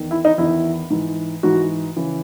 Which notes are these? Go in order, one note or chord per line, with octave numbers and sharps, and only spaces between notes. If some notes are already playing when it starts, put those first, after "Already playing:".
Already playing: E2 D#3
E4
D#4
E2 D#3 E4
G#2 E3
G#2 E3 F#4
C#3 E3